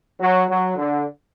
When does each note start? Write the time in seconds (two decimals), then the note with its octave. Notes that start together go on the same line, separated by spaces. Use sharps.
0.19 F#3
0.48 F#3
0.76 D3